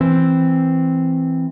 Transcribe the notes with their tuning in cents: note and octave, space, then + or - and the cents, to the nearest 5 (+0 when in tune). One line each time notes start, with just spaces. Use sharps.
E3 +0 C4 +0